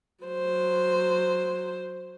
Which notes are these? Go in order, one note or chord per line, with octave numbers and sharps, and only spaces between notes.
F#3 C5